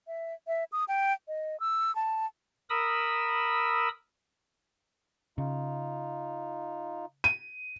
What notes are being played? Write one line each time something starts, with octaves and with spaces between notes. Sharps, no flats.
E5
E5
D#6
G5
D#5
E6
A5
A#4 B5 D#6 E6
C#3 D#4 F4
D#7